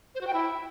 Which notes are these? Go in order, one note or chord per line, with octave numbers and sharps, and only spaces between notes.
C5
F#4
G5
E4